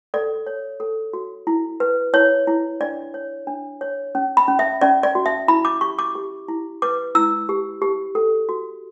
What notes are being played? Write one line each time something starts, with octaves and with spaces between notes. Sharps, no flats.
A4 D5
C#5
A4
F#4
E4
B4
E4 C#5
E4
D4 D5
C#5
D4
C#5
C#4
B5
C#4
E5
C#4 D5
D5
F#4
E5
E4 B5
D6
G4 C#6
D6
G4
E4
B4 D6
E4 E6
G4
G4
A4
F#4